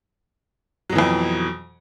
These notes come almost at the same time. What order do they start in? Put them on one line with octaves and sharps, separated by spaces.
F#3 B2 E3 F2